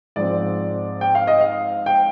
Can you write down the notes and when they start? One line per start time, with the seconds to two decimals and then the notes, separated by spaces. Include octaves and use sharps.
0.16 G#2 F3 C4 D5
1.01 G5
1.15 F5
1.27 D#5
1.41 F5
1.86 G5